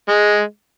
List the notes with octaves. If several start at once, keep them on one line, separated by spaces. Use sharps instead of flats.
G#3